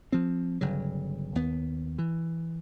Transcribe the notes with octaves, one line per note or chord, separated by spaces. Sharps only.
F3 C4
G1 C#3 F#3
D#2 B3
E3